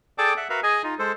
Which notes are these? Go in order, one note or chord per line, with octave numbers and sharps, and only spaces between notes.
G#4 A4 D5 G5 A5 D6
E5 F#5
F#4 A#4 B4 E5 F5
G#4 D#5 G#5
D#4 F4
G#3 A4 C5